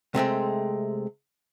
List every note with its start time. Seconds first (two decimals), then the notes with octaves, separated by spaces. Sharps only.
0.15 C3 G#3 A3 C4